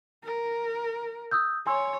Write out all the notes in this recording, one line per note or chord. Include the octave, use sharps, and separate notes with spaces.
A#4
D#6 E6 G6
C#5 G#5 C6 E6